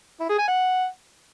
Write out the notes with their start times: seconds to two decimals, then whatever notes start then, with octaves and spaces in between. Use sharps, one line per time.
0.20 E4
0.29 G#4
0.38 G#5
0.48 F#5